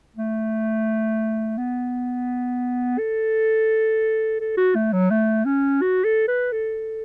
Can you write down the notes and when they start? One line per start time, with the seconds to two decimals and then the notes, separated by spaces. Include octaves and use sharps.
0.16 A3
1.58 B3
2.98 A4
4.40 A4
4.57 F#4
4.75 A3
4.93 F#3
5.11 A3
5.45 C#4
5.82 F#4
6.05 A4
6.28 B4
6.52 A4